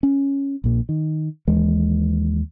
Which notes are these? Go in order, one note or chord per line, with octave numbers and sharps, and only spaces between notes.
C#4
A#1 A#2
D#3
D#2 E3 G#3